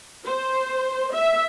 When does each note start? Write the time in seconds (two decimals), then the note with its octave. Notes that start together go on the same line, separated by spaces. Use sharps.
0.25 C5
1.14 E5